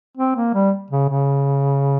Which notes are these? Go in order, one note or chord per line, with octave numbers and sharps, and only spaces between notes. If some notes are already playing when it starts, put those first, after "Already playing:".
C4
A#3
G3
C#3
C#3